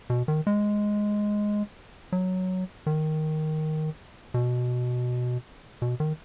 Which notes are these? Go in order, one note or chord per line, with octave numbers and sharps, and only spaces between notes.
B2
D#3
G#3
F#3
D#3
B2
B2
D#3